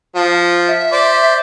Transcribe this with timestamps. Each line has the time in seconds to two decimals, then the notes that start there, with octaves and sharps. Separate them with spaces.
0.15 F3
0.68 E5
0.92 C5 D5